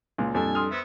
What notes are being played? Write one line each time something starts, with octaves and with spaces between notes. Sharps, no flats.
C#2 A#2
F2 G3 D4 A4 G#5
C6 D#6 F6
B3 C4 E5